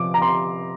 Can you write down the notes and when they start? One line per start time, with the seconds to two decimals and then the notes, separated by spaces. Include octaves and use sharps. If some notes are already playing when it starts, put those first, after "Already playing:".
Already playing: C3 F3 D6
0.14 A#5
0.21 C3 C6